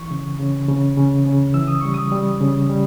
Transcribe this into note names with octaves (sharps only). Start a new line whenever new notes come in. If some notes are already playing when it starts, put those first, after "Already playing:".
Already playing: E3 C#6
C#3
C#3
C#3
C#3
C#3
E3 E6
D#6
G3 C#6
D#6
G3
C#3
G3